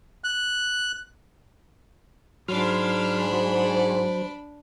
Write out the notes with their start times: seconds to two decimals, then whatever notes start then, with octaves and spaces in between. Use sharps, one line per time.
0.24 F#6
2.48 G#2 F#3 D4 B5 C6 F6
3.33 F#3 C5